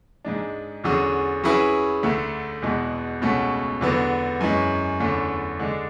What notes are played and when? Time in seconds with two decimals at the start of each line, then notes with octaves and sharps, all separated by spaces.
0.24 G#2 G#3 D4
0.84 E2 D3 F#3 C#4 G#4
1.43 F#3 C#4 E4 G#4 B4
2.03 D2 D3 A3
2.62 E2 B2 G#3
3.21 C#2 B2 A3 C#4 F#4
3.81 E2 D3 F#3 B3
4.40 F#2 E3 G#3 C#4
5.00 E2 D3 A3 C#4 E4
5.59 D3 G#3 D4